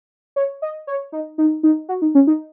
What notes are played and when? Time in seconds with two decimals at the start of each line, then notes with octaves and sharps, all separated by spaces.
0.36 C#5
0.62 D#5
0.87 C#5
1.12 D#4
1.38 D#4
1.63 D#4
1.89 F#4
2.02 D#4
2.15 C#4
2.27 D#4